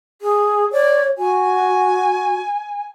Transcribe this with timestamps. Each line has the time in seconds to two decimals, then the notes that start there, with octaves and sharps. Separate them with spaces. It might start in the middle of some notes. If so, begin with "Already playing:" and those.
0.22 G#4
0.72 C#5 D5
1.18 F#4 G#5